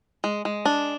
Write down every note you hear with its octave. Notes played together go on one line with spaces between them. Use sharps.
G#3
G#3
D4